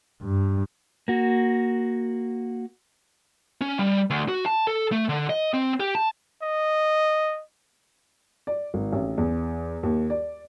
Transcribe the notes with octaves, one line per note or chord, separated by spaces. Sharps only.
G2
A#3 F#4
C#4
G3
D2
F#4
A5
A4
A3
D3
D#5
C4
G4
A5
D#5
D5
G#1
A1
E2
D#2
D5